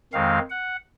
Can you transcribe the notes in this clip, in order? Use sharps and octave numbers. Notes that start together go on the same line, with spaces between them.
F2 D#3 G#3 C4 F5
F#5